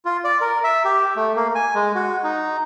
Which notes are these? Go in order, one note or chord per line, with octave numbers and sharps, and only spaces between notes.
F4
D5
A#4
E5
G4
A3
A#3
G#5
G#3
F#4
D#4